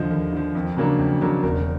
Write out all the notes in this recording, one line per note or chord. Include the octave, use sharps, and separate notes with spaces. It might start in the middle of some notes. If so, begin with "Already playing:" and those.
Already playing: D#2 D3 F3 D#5
D#2
D3 F3
F2
C#3 F#3 A#3 D4
F2
C#3 F#3 A#3 D4
E1 A#4